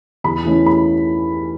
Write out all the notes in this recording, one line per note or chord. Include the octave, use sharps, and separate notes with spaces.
E2 B5
E3 A3 C#4 E4
B5